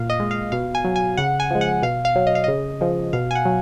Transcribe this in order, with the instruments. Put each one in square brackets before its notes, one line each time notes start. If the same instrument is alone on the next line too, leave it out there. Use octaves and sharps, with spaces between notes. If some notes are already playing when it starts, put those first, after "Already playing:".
Already playing: [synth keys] A#2 F5
D#5
G#3
F5
B2 F5
G#5
F#3
G#5
C#3 F#5
G#5
F3 G#3
F#5
B2 F5
F5
F#3
D#5
F5
C#3 D#5
F3 G#3
B2 F5
G#5
F#5
F#3